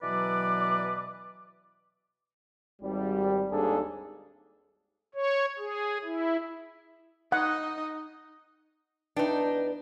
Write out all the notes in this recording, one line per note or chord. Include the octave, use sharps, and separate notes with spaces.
B2 E3 F#3 B4 D5 D6
G#1 G3
G#1 D#2 G3 D4 G#4 A4
C#5
G#4
E4
D#4 D#5 F#5
E2 D4 D#4 B4 G5